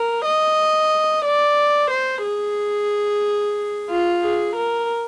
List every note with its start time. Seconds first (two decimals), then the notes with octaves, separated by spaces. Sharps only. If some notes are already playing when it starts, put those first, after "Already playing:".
Already playing: A#4
0.25 D#5
1.25 D5
1.91 C5
2.24 G#4
3.90 F4
4.22 G#4
4.56 A#4